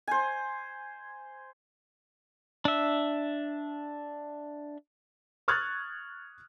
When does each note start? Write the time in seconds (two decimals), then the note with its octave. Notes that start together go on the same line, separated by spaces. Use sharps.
0.07 C5 G#5
2.65 D4 E5
5.48 C#6 D#6 F6 F#6 G#6 A6